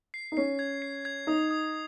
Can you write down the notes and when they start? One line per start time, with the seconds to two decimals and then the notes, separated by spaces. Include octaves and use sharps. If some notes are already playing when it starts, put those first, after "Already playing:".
0.14 C7
0.32 D#4
0.37 C#4 C7
0.59 G#6
0.82 C7
1.05 G#6
1.27 D#4 D#6
1.51 D#6